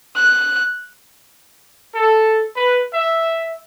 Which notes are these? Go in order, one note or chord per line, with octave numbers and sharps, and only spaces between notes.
F#6
A4
B4
E5